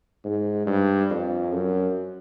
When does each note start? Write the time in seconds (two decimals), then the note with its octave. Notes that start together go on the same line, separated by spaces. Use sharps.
0.24 G#2
0.66 G2
1.10 F2
1.52 F#2